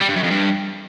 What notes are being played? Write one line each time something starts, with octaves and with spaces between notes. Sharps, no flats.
G3
G2
F#2
F2
G2